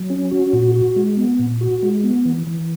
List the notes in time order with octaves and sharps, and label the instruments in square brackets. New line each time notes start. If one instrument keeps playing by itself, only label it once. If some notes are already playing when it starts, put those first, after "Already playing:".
Already playing: [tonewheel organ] F#3
C#4
F#4
A#2
F#4
G#3
B3
A#2
F#4
G#3
B3
E3
E3